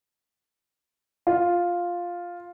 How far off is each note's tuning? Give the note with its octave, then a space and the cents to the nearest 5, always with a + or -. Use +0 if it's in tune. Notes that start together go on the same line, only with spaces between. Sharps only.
F4 +5